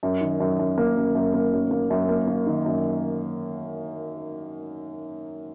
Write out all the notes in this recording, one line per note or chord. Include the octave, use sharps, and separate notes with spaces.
F#2
D#3
F#2
F#2
A#3
F#2
F#2
A#3
F#2
A#3
F#2
A#3
A#3
D#3
F#2